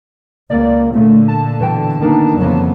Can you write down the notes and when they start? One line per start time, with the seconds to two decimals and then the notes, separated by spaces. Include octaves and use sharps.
0.50 C#2 A#3 D5
0.95 A#2 D3 A3
1.28 A5
1.60 B2 E3 G5
2.01 D#3 A#3 B3 D4 D#4
2.37 F2 C#3 E3 F#3 A#3 B3